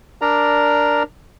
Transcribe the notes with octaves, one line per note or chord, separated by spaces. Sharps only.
D4 A#4 D5 A#5